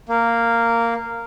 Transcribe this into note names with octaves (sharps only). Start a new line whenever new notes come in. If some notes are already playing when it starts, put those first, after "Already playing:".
A#3